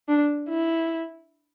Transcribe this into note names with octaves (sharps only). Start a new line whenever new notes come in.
D4
E4